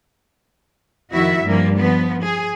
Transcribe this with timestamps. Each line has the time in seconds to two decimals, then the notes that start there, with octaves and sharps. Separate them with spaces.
1.12 F2 D#3 E4 F#4 E5
1.45 G2 F3 G3 A#3
1.77 F3 B3
2.24 G#4